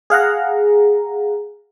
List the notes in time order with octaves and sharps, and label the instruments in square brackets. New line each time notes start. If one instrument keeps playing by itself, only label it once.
[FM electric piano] G#4 F5 F#5 A#5